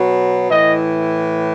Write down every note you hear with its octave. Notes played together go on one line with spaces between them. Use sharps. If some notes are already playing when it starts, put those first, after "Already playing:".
Already playing: B2 F#3
A2 E3 D#5